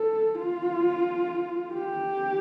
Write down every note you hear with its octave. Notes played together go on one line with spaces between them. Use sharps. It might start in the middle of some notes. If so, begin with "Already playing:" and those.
Already playing: A4
F4
G4